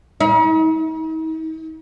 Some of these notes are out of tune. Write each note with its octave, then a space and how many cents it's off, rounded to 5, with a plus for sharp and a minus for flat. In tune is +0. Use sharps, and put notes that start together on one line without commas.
D#4 +45